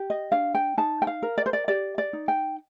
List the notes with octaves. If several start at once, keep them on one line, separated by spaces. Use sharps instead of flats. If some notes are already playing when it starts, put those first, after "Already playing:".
Already playing: G4
D#5
D4 F5
G5
D#4 A5
G5
F5
A#4
D5
C5
D5
G4 D5
D5
D#4
G5